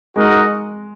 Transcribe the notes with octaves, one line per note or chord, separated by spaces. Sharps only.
G#3 D#4 F#4 A#4 D#5 F#5